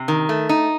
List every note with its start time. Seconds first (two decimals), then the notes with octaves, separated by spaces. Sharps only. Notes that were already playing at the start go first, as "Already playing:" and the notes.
Already playing: C3
0.08 D#3
0.29 A3
0.49 D#4